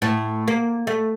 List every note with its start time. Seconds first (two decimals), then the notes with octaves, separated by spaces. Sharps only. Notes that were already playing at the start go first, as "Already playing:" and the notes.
0.02 A2
0.48 A#3
0.87 A3